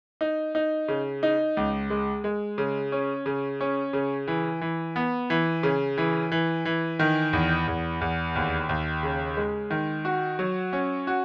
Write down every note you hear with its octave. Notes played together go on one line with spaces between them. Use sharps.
D#4
D#4
C#3
D#4
C#2
G#3
G#3
C#3
C#4
C#3
C#4
C#3
E3
E3
B3
E3
C#3
E3
E3
E3
D#3
E2
E2
E2
D#2
D#2
C#3
G#3
D#3
F#4
F#3
C#4
F#4